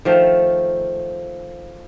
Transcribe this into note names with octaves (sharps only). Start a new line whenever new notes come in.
D#3 F3 A3